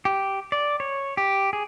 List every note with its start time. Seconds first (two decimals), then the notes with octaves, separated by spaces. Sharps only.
0.05 G4
0.52 D5
0.80 C#5
1.17 G4
1.53 G#4